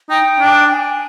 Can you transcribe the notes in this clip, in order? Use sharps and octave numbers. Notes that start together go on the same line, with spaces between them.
D#4 G5
D4
G#5